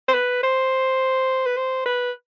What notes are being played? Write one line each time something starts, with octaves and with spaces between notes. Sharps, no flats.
C5
B4
C5
B4
C5
B4